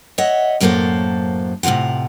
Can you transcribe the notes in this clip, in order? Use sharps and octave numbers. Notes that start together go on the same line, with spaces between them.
C#5 D#5 E5 F#5
F#2 A2 F#3 A#3 A4 C5
A2 C3 F3 F4 F#5